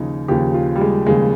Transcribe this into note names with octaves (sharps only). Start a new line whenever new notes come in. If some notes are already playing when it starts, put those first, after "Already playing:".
Already playing: D#2 C#3 F3 D#4
D#2 C#3 F3 G4
F4
G3
G#3
D#2 C#3 F3 G#3